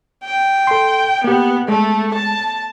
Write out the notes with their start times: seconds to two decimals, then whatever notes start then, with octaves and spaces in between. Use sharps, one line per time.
0.25 G5
0.67 A4 C6
1.24 A#3 B3 G4
1.68 G#3 A3
2.15 A5